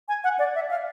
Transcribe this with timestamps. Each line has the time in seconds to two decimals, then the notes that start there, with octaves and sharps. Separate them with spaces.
0.08 G#5
0.24 F#5
0.39 D5
0.55 E5
0.70 F5